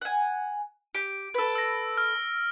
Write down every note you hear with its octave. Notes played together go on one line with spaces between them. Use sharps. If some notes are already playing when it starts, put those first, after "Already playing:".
F#5 G#5
G4 D7
A4 B4
E6 A#6
F6